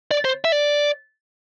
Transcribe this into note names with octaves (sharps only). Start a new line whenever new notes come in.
D5
C5
E5
D5